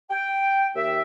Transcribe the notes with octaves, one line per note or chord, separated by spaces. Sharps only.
G5
D#2 E5